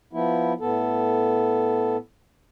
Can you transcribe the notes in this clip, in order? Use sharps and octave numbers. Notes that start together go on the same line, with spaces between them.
F3 B3 E4
A2 B3 A4